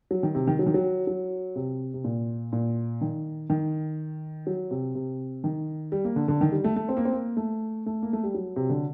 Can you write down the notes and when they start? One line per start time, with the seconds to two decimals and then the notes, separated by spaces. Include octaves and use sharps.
0.11 F#3
0.23 D#3
0.35 C3
0.47 D#3
0.59 F#3
0.66 D#3
0.74 F#3
1.07 F#3
1.56 C3
1.94 C3
2.04 A#2
2.53 A#2
3.01 D#3
3.50 D#3
4.47 F#3
4.71 C3
4.95 C3
5.44 D#3
5.92 G3
6.05 A#3
6.16 D3
6.28 D3
6.41 D#3
6.52 G3
6.64 A3
6.76 A3
6.89 C4
6.97 A#3
7.05 C4
7.13 A#3
7.37 A3
7.86 A3
8.02 A#3
8.13 A3
8.23 G3
8.34 F#3
8.56 C3
8.70 D3